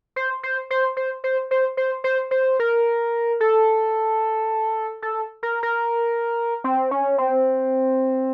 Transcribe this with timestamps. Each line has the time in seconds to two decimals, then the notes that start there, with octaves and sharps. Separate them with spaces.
0.16 C5
0.43 C5
0.70 C5
0.97 C5
1.24 C5
1.51 C5
1.77 C5
2.04 C5
2.31 C5
2.59 A#4
3.40 A4
5.02 A4
5.43 A#4
5.63 A#4
6.64 C4
6.91 C#4
7.18 C4